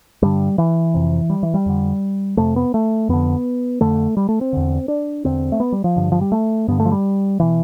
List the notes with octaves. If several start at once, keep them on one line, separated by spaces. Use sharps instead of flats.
G2 D3 G3
E3
F2 C3
G3
E3
G3
F2 D3
F2 C3 A3
B3
A3
F2 D3 B3
F2 D3 A3
G3
A3
C4
E2 D3
D4
E2 D3 C4
A3
B3
G3
F3
G2 D3
F3
G3
A3
G2 D3 B3
A3
F3
G3
B2 E3